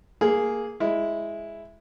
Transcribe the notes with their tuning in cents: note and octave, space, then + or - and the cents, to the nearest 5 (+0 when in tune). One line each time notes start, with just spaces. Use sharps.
A#3 +0 G#4 +0
G#3 +0 E4 +0